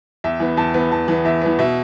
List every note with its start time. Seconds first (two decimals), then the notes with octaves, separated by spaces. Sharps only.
0.24 E2 E5
0.40 E3 B3
0.57 E2 A5
0.74 E3 B3
0.91 E2 A5
1.08 E3 B3
1.25 E2 E5
1.41 E3 B3
1.59 B2 E5